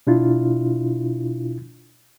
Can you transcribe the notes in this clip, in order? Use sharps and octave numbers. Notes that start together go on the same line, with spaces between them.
B2 D4 E4 F4